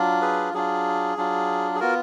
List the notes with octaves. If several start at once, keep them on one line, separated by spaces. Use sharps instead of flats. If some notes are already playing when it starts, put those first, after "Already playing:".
Already playing: F#3 D4 F4
G#4 B4
F#3 D4 F4 G#4
F#3 D4 F4
G#4
B3 F4 F#4 A#4